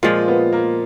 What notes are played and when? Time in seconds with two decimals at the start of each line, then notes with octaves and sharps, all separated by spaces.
0.03 A#2 F3 G#3 F4
0.28 B3
0.52 A#3